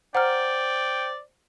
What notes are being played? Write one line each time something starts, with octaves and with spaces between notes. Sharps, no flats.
C5 D5 F#5 G5 A#5 F6